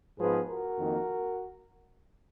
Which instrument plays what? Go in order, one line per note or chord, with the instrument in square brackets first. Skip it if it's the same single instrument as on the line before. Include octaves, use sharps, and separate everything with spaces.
[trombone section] G#2 F3 B3 G#4 B4
F#4 A#4
F2 D#3 A#3